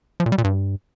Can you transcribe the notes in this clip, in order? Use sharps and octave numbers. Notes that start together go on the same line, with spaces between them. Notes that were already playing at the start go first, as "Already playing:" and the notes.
F3
A#2
G3
A#2
G2